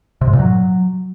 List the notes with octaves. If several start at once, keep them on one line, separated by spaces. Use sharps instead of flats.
C3
G#2
A#2
F#3